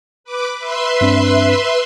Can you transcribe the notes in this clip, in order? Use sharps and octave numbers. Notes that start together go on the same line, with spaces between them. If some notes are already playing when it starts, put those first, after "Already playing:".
B4 D6
B4 E5 C6
G2 C4 D4